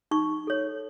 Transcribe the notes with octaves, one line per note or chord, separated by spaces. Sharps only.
D#4 C#6
A4 C#5